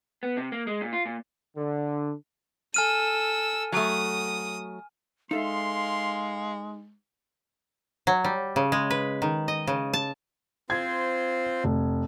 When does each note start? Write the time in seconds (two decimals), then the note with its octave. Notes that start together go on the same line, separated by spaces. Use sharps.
0.23 B3
0.37 C3
0.52 A#3
0.67 G#3
0.81 A#2
0.93 F4
1.06 A#2
1.57 D3
2.74 A4 G#5 E6 F6 D#7
3.72 F#3 A3 D#6
5.31 G#3 D#4 A4 E5 F5 C6
8.07 F#3
8.24 G3
8.56 C#3
8.72 G#3
8.91 B4
9.22 D#3
9.48 D#5
9.67 C#3
9.93 A5
10.70 C4 F4 C5 G#6
11.64 F1